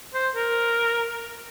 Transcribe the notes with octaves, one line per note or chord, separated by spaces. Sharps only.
C5
A#4